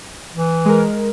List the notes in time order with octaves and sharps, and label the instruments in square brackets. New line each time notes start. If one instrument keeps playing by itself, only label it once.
[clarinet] E3
[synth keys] G#3 A#4